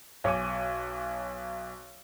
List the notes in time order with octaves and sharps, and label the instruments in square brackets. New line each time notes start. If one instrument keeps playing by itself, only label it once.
[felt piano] B1 C#5 G#5 D6 D#7